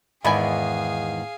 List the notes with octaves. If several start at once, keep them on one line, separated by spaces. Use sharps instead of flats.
E2 G#2 D#3 B3 E4 G#4 F5 G#5